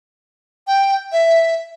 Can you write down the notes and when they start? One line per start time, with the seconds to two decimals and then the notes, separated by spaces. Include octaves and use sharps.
0.67 G5
1.12 E5